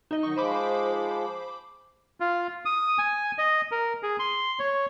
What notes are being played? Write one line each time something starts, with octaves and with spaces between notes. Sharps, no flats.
D#4 D#5
D#3 F#3 C#6
F3 G#3 C5 B5 D6
F4
D#6
G#5
D#5
A#4
G#4
C6
C#5